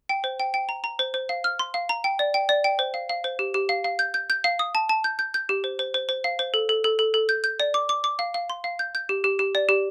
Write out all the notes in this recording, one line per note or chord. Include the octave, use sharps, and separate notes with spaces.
G5
C5
G5
G5
A#5
A#5
C5
C5
F5
F6
C6
F5
A#5
G5
D5
G5
D5
G5
C5
F5
F5
C5
G4
G4
F5
F5
G6
G6
G6
F5
D#6
A5
A5
G6
G6
G6
G4
C5
C5
C5
C5
F5
C5
A4
A4
A4
A4
A4
G6
G6
D5
D6
D6
D6
F5
F5
C6
F5
G6
G6
G4
G4
G4
D5
G4